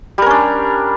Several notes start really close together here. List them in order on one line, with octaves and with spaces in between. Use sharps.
G3 A#4 C#4 D4